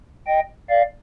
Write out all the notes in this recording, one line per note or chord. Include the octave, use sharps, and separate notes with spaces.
D#5 G5
D5 F5